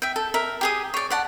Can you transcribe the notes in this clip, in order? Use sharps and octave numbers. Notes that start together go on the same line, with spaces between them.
E5 G5
A4
A#4 E5
G4 G#4 D#6
C#5 D5
D5 F#5 A5